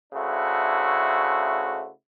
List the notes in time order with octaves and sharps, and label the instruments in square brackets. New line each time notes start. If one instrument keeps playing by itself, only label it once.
[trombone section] C#3 A3 D4 E4 F#4 C5